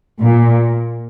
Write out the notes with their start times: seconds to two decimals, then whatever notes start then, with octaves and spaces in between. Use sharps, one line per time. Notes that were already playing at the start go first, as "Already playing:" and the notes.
0.21 A#2